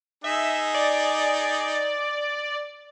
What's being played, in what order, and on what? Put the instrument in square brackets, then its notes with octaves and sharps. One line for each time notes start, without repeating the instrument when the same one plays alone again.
[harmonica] D#4 G#4 [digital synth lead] E5
[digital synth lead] D5